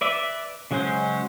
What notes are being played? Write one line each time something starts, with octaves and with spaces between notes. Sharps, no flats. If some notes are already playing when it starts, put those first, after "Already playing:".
B4 D5 E5
C#3 F#3 G#3 C#4 C5